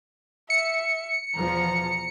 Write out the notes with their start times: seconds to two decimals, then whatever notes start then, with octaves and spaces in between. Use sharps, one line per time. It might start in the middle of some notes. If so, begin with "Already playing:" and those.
0.50 E5 C#7
1.35 E2 B2 F3 A#5